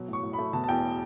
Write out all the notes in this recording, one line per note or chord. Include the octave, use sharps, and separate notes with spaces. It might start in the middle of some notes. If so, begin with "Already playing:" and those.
Already playing: B2 F#3
A2
C#6
A2
B5
A3
B2 A5
A5
E2 G5